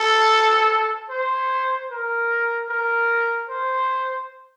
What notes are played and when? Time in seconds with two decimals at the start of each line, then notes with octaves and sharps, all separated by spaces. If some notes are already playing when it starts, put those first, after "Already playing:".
Already playing: A4
1.10 C5
1.91 A#4
2.69 A#4
3.49 C5